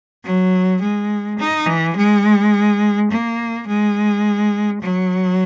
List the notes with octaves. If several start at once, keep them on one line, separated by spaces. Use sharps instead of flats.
F#3
G#3
D#4
E3
G#3
A#3
G#3
F#3